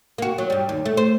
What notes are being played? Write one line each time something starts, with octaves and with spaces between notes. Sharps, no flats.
A#3 F#4
F#3
G2 G3
D#2
A3
C5